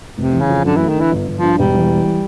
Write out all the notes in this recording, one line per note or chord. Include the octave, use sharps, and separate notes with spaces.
F1 C3
E3
C#3
F2
F#2 D3
E3 A3
D#3
D3
E3
G1
G1
F3
G2
E1 G3
E3